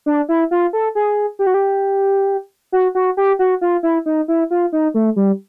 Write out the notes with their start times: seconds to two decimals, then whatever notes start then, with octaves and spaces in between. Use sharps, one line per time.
0.06 D4
0.29 E4
0.51 F4
0.73 A4
0.95 G#4
1.39 G4
1.46 F#4
1.54 G4
2.72 F#4
2.95 F#4
3.17 G4
3.39 F#4
3.61 F4
3.83 E4
4.06 D#4
4.28 E4
4.51 F4
4.72 D#4
4.94 A3
5.16 G3